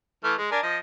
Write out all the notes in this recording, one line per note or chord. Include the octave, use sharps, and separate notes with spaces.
E3 A3 F6
G#3
D4 A#4 G#5
F3 D#5